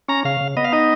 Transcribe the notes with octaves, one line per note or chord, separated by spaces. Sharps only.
C#4 A#5
C#3 F5
C#3
B3 D#5
F5
D#4 D#5